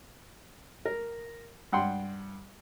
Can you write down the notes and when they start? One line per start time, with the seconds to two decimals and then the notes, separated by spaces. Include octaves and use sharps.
0.85 A#4
1.73 G2 F#5 G5 C6